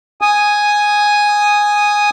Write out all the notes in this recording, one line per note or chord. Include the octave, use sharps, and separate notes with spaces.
G#5 D#6